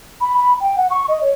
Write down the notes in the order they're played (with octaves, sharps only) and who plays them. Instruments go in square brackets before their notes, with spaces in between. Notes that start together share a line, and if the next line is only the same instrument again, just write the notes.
[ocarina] B5
B5
G5
F#5
C#6
D#5
C#5